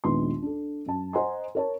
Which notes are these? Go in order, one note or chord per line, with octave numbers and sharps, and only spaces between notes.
A#1 D#2 G#3 B3 F4 C6
D4 A4
F#2 A5
C5 D#5 F#5 G#5 A#5 C6
A#4 C#5 A5